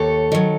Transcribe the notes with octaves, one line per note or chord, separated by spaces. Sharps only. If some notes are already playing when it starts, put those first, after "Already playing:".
Already playing: D#2 A4 C#5
D#3 F#3